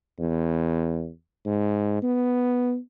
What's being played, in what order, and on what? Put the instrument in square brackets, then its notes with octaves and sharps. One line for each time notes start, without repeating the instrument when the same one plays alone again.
[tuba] E2
G#2
B3